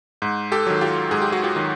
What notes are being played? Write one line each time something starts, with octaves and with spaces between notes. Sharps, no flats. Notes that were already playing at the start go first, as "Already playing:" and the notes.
G#2
G4 A4
D#3 F#3
F4 G4
G#2 G#4
G4
F#4
F4 G4
D#3 F#3